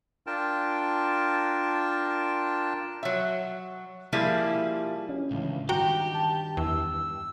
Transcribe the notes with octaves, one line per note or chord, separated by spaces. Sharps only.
D4 F4 A#4 G5 A5
F#3 E5
F3 G3 A#3 E4 G#4
C#4
C#2 A2 D3 E3
G2 D#3 F#4 G4 G5 A#5
A5
E2 E6